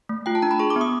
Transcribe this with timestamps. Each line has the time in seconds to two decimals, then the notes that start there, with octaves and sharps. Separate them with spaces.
0.09 A3
0.26 F4 G5
0.35 A5
0.42 D4 A#5
0.51 B5
0.59 G#4 C#6
0.70 D6
0.76 B3
0.81 D#6